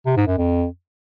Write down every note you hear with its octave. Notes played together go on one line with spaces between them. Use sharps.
C3
G#2
F#2
F2